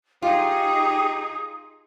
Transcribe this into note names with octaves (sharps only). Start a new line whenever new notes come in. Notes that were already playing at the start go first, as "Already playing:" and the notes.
D#4 F4 G4 G#4 D#6